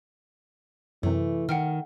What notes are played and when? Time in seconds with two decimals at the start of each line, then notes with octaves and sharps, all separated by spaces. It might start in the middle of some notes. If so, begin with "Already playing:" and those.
1.03 F#2 C3 E3 A3
1.49 D#3 F#5 G5 F6